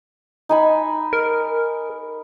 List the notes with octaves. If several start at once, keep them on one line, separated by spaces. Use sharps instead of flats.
D#4 G#5 B5
A#4